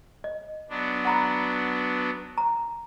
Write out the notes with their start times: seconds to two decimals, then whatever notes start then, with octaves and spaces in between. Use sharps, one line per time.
0.24 D#5
0.70 F#3 B3 D4
1.05 F#5 A#5 B5
2.38 A#5